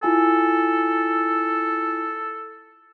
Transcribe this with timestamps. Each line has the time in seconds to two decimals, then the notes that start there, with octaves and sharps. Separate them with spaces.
0.03 E4 F4 A4 G#5